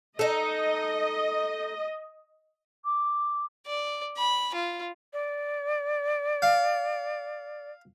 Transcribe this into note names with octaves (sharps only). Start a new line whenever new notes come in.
D#4 A4 D#5
D6
D5
B5
F4
D5
F5